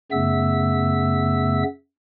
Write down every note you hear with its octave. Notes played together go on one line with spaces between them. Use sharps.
F#2 C#3 A3 B3 E5 E6